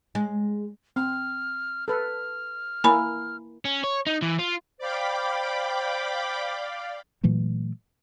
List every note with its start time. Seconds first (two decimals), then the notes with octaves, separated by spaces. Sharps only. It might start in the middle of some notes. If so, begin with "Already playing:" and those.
0.15 G#3
0.96 C4 F6
1.88 A4 B4 F6
2.84 A#3 E4 G#5 B5
3.65 C#4
3.84 C#5
4.07 D#4
4.22 E3
4.39 F4
4.79 C5 D5 F5 G5 B5 D6
7.23 A#2 E3 F#3 A3